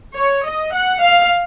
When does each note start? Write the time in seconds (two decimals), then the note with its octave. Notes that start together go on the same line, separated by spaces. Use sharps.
0.18 C#5
0.47 D#5
0.74 F#5
1.03 F5